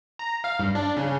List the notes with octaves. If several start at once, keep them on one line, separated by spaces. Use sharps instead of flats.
A#5
F5
G2
D4
C#3